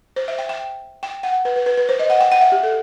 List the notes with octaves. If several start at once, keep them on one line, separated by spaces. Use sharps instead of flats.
C5
E5
G5
G5
G5
F#5
B4
B4
B4
B4
C5
D#5
F#5
G5
F#5
E5
G4
A4